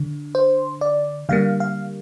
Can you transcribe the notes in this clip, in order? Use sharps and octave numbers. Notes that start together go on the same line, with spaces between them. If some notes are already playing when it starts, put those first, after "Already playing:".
Already playing: D3
C5
D5
D3 G3 A#3 F5
F5